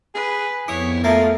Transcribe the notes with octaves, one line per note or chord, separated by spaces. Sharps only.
G#4 B4
F2 B3 E4 C#5 D#6
F3 A3 A#3